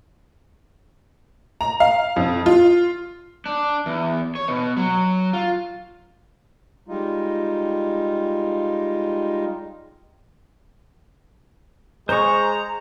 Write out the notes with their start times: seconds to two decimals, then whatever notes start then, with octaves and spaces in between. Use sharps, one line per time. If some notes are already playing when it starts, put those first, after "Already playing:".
1.61 A#5
1.80 F5
2.16 F2
2.46 F4
3.46 D4
3.86 E2
4.35 C#5
4.48 B2
4.77 F#3
5.33 F4
6.88 G3 G#3 D#4 F4
12.09 G#3 G#4 C5 A#5 C#6